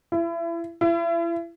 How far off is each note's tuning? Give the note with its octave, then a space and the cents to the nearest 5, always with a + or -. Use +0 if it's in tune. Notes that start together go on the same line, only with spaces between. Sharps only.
E4 +30
E4 +35